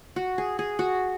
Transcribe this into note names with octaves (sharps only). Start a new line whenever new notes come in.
F#4
G#4
G#4
F#4